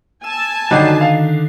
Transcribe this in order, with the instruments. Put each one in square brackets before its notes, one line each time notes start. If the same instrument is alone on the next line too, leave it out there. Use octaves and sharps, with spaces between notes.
[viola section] G#5 A5 [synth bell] E6
[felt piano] D3 D4 D#4 [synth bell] D#3 C7 [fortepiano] F#3 G3 F#4
[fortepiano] F5